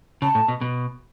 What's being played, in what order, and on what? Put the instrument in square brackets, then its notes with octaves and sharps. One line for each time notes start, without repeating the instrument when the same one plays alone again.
[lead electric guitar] C#3 [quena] A5
[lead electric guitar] A2
B2
B2